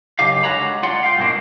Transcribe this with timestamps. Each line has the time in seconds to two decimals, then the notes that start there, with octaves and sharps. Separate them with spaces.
0.19 F#2 C#3 D#4 G4 F5
0.43 D3 G#3 F#4 C#5 A#5 B5
0.83 F4 D5 F#5 C6
1.03 F5 G5
1.17 C2 G#2 B2 A#3 D4